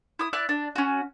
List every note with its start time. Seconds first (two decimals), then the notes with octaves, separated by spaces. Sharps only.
0.19 E4 D#6
0.33 E4 D5 F#6
0.49 D4
0.75 C#4 F#4